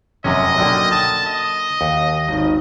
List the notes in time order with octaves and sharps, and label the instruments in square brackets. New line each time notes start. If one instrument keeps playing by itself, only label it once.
[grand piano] F1 [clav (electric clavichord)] F#2 C3 C#4 [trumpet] D#5
[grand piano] B1 D5 G5 [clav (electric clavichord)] D3 A#3
[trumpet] A5 [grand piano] D#6
[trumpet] D#5
[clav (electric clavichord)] D#2
[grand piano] G#1 D#3